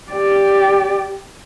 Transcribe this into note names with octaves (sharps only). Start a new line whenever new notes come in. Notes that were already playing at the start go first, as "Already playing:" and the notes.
G4 D5